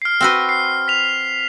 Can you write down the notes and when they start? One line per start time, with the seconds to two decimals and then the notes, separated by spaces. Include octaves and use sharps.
0.02 F6 C7
0.21 C4 F#4 B4
0.49 C7
0.88 B6 F7